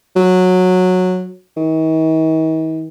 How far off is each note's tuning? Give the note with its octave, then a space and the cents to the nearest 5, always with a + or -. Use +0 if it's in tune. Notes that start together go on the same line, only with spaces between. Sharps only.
F#3 -15
D#3 +45